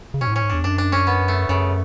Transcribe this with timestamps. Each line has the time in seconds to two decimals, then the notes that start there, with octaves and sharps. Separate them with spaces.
0.14 C#3
0.21 B2 C#4
0.27 G#2
0.32 A2 C#4
0.42 G#2
0.49 E2 D4
0.64 F#2 D4
0.78 D4
0.92 C#4
1.07 B3
1.28 A3
1.49 F#2 C#3